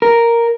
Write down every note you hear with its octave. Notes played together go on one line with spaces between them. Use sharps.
A#4